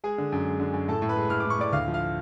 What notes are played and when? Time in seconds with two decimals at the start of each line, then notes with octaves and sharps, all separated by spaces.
0.04 G#3 G#4 G#5
0.18 D3
0.32 F#2
0.46 G#3
0.60 D3
0.74 F#2
0.88 A2 A4 A5
1.02 A2
1.09 B4 B5
1.16 G#3
1.30 A2 F6
1.40 A2 D6
1.50 C#6
1.58 A2 D5 D6
1.72 D2 F5 F6
1.88 F3
1.94 F5 F6